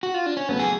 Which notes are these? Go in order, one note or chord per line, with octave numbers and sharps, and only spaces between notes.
F#4
F4
D4
C#4
C#3 F#3 A3 B3
G#4